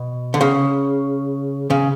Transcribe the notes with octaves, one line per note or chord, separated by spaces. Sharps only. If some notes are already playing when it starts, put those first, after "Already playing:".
Already playing: B2
D3
C#3
C#3